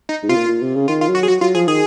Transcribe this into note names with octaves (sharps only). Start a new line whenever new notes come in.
D#4
G#2
C3 F4
A#2
A#2
C3
C#3
D#3 F4
F4
F#3
F#4
G#4
F#3 F#4
F#3 F4
F3 G#4
D#3 G#4